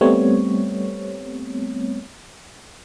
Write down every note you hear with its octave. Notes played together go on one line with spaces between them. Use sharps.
G3 A3 B3 C4 C#5